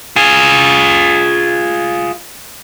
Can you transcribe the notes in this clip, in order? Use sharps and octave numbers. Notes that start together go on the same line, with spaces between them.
F4 G#4